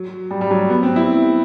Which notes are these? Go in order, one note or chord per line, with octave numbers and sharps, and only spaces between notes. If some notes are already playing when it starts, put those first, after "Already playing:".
Already playing: F#3
G3
G3
F#3
B3
C4
E4